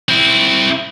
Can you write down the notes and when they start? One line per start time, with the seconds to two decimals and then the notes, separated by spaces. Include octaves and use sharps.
0.09 C4 E4